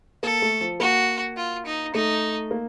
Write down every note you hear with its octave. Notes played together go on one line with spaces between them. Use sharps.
A#3 A4
A3
F3
A#3 F#4
F4
D#4
A3 D#4
A#3